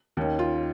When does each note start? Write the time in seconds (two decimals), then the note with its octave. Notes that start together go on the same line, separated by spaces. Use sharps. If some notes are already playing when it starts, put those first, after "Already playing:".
0.17 D#2 D#3 C#4
0.39 F4